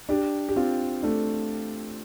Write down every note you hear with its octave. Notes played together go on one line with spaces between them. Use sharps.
D4 G4
G4
C4 F4
A3 D4